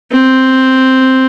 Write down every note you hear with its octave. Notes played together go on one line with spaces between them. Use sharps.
C4